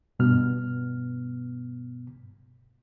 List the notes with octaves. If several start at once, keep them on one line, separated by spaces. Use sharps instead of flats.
G2 B2 B3 F6